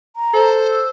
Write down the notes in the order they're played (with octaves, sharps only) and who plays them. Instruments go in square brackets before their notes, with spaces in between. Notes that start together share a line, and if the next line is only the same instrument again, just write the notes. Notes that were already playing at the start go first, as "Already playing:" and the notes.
[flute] A#5
[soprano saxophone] A4 [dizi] C5
[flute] E6